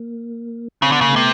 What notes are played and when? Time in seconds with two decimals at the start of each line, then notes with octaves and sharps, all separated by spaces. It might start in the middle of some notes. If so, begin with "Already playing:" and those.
Already playing: A#3
0.82 C#3 C4
0.92 D3 B3
1.01 C#3 A#3
1.12 C3 A3 B3